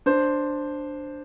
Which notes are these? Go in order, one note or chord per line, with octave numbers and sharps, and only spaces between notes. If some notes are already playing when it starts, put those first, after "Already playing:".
D4 C5